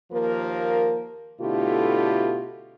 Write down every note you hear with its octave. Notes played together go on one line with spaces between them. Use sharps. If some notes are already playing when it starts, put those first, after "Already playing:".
D#2 F3 A#3 A#4
B2 D3 A3 E4 F4 G4